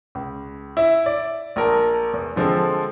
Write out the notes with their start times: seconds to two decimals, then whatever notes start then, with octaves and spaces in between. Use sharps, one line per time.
0.15 C#2
0.77 E4 E5
1.06 D5
1.56 A#1 A#4 A5
2.13 E2
2.36 D3 F3 G#3 C4 A4